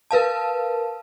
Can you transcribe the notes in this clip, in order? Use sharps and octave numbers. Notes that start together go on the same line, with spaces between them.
A#4 B4 F5 A5